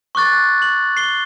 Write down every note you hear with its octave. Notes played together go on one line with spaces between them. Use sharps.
C#6 D6 F#6 A6
F#7
C7 G7